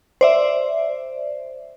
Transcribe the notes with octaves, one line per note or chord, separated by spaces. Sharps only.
C5 D5 E5